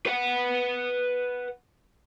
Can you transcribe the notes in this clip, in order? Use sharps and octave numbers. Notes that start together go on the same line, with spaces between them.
B4 F#5